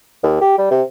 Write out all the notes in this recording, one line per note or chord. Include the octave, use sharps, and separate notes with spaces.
D#2
G4
G3
C3